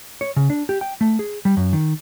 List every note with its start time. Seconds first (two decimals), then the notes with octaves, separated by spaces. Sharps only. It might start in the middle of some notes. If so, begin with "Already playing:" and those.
0.21 C#5
0.36 C#3
0.50 D4
0.69 G4
0.81 G5
1.01 A3
1.19 G#4
1.45 G3
1.57 F#2
1.73 D#3